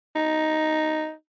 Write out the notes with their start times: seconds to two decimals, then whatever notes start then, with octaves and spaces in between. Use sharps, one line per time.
0.16 D#4